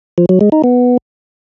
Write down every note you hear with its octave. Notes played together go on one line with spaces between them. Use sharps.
F3
F#3
G#3
D#4
B3